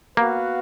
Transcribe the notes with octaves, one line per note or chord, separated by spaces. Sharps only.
A#3 B3 F#4 B4 F5